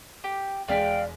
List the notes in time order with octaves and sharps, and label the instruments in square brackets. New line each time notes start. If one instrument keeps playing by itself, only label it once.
[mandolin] G4
[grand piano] E1 G#3 B6 [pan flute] D5 [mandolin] F5 [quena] G5